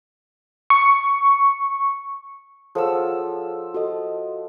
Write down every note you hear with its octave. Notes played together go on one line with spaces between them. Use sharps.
C#6
F3 G#4 A4 C#5 F#5 E6
F#4 A4 D#5